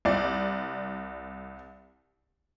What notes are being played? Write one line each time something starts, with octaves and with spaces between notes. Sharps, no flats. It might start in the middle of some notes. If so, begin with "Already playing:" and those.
C2 D5